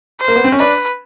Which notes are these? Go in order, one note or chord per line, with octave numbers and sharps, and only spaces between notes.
C5
A#3
B3
C4
C#4
D4 B4